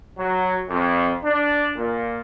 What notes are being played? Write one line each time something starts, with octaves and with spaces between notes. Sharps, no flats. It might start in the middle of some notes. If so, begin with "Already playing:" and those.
F#3
F2
D4
A#2